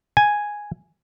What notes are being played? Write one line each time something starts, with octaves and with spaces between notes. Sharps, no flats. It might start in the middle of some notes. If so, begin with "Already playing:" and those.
G#5